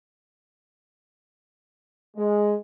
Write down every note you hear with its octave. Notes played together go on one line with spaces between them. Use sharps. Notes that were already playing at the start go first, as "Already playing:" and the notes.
G#3